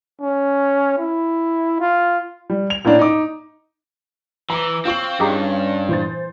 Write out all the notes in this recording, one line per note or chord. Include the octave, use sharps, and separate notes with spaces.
C#4
E4
F4
G3
F7
A2 A#3 C#4 D4
D#4 D6
E3 A#5 D6
C4 F4 C#6 F#7
G2 C#4 D#4 G4 G#4
A#2 E3 C5 A6